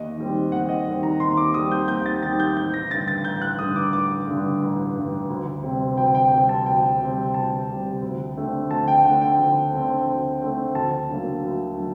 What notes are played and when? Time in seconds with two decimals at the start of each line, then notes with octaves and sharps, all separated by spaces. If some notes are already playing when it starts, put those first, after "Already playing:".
Already playing: D#2 D#5
0.18 D#3 G3 C4
0.52 D#2 F#5
0.69 D#5
0.86 D#3 G3 C4 D#5
1.03 A#5
1.20 D#2 C6
1.37 D6
1.54 D#3 G3 C4 D#6
1.72 G6
1.88 D#2 G6
2.06 A6
2.23 D#3 G3 C4 A6
2.40 G6
2.57 A1 G6
2.74 A#6
2.90 G2 D3 A6
3.08 A6
3.25 A1 G6
3.42 F#6
3.59 G2 D3 D#6
3.76 D6
3.93 A1 D6
4.27 G2 D3
4.62 A1
4.96 G2 D3
5.30 D2
5.64 C3 G3 C4
5.97 D2 G5
6.15 G5
6.32 C3 G3 C4 G5
6.49 A5
6.66 D2 G5
7.00 C3 G3 C4
7.34 D2 A5
7.68 C3 G3 C4
8.02 D2
8.37 D3 A3 C4
8.71 D2 A5
8.88 G5
9.05 D3 A3 C4 F#5
9.22 G5
9.38 D2
9.73 D3 A3 C4
10.07 D2
10.41 D3 A3 C4
10.75 D2 A5
11.10 D3 F#3 A#3
11.44 D2
11.77 D3 F#3